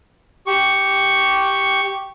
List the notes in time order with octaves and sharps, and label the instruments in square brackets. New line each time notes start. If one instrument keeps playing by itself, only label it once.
[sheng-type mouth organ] G4 C#6